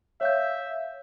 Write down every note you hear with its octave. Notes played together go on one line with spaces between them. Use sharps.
C#5 E5 F5 G6